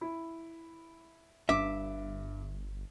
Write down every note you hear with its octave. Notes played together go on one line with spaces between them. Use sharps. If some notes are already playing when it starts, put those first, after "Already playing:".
E4
G1 G2 E5 D6